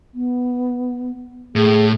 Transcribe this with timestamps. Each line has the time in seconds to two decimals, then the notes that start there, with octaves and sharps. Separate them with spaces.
0.14 B3
1.56 A2 G#4